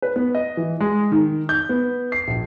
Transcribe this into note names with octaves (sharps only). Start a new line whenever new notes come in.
B4
B3
D#5
E3
G#3
D#3
G6
B3
C7
A#1